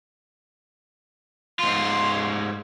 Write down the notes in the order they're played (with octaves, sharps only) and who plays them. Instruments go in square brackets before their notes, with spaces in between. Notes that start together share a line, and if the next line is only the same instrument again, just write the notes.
[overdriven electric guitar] G#2 F4 [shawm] C6